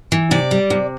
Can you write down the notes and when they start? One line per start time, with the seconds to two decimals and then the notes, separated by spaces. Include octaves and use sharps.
0.12 E3
0.31 C3 D5
0.51 G3
0.70 C3